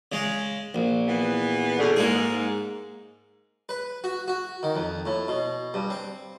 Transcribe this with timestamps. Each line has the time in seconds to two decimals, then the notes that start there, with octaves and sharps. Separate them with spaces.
0.12 C#3 G#3
0.74 A#1
1.07 E3 B3
1.79 E2 B2 D3
1.96 G#2 A#3 G#4
3.69 B4
4.04 F#4
4.28 F#4
4.63 D#3
4.75 F2
5.06 A2
5.28 B2
5.74 G2
5.90 C4